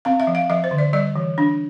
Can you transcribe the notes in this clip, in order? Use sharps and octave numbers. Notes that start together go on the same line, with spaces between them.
C4 F5
E5
F3
F5
F3 E5
C5
D3
D5
G3 D5
E3
D4